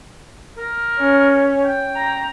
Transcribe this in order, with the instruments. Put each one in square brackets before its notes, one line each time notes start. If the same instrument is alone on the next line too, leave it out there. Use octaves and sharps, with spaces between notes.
[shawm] A#4
[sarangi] C#4
[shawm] G5
[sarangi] A#5